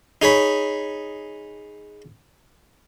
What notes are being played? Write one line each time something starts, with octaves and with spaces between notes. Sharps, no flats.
D#4 G#4 C#5 B5